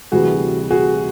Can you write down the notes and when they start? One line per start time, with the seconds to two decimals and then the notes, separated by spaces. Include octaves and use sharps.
0.11 D2 C3 E3 G3 F#4 G#4
0.70 F#4 G#4